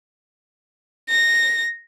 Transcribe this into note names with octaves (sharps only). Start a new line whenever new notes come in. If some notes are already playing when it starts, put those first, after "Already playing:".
A#6